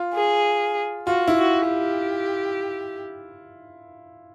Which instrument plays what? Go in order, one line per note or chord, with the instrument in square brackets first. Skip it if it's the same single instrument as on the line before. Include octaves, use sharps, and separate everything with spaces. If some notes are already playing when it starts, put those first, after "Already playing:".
Already playing: [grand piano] F4
[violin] G#4
[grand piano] F4 [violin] F#4
[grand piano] E4
[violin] F#4
G4